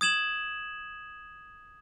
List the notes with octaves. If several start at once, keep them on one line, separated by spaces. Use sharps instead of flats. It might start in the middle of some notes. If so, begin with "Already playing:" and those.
D#6 G#6 E7 F#7